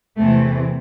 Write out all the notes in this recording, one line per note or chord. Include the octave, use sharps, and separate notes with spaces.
E2 C3 E3 A3